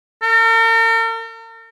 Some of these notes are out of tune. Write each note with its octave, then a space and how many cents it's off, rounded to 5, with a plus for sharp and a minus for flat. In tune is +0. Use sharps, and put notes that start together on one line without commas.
A#4 -45